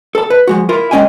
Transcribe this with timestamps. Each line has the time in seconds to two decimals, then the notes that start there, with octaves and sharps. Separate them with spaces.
0.15 A4 A5
0.30 B4
0.47 F3 G#3 F#4
0.69 E4 F4 A#4
0.91 G#3 C4 C#4 D#5 G5 G#5